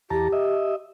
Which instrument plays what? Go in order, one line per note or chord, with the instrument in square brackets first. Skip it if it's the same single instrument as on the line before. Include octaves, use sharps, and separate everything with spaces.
[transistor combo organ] E2 A5 A#5 [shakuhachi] G4
[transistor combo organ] D#5 E5